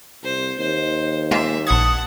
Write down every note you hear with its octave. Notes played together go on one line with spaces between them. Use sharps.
C2 C5
D#2 C5
G#3 A#3 F4 E5
A#1 F#5 A5 D#6 G#6